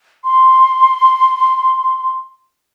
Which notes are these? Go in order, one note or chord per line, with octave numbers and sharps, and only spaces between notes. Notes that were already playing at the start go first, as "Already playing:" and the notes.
C6